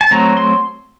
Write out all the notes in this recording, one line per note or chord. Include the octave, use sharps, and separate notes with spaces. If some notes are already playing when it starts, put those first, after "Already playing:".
A5
F#3 A3 C4 A#5
C6